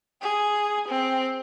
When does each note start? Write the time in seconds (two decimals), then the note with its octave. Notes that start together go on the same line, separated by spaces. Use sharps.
0.22 G#4
0.89 C4